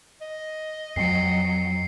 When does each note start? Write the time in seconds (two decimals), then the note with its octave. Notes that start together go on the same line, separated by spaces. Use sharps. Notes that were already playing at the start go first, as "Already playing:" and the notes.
0.21 D#5
0.96 F2 F#3 C4 C7 C#7